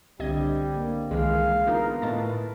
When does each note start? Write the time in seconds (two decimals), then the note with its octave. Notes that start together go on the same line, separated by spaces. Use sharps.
0.20 C2 D3 G3 C4 G4 D#5 G#6
0.76 A#3
1.11 C2 D#3 E3 G#3 F5
1.67 B3 D4 D#4 F4 A#4
2.02 A2 B4 D#5 A5 A6